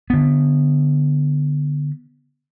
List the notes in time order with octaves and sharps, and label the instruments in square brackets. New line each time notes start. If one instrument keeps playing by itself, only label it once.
[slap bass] D3 B3